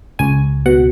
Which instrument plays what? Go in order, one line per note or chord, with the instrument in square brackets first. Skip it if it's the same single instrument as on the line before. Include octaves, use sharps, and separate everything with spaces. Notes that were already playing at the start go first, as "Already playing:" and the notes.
[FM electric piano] C#2 G#5
B2 F#5